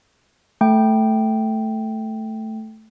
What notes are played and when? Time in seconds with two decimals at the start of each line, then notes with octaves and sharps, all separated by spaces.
0.61 A3 G5